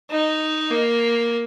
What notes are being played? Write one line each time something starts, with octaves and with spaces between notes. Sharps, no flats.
D#4
A#3